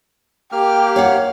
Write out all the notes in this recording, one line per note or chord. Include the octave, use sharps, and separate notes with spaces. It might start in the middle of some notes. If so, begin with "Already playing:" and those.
A#3 G4 F6
C#5 F5 F#5